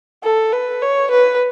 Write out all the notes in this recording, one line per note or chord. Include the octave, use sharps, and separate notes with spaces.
A4
B4
C#5
B4